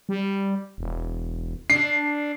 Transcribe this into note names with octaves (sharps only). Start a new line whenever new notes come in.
G3
E1
D4 C7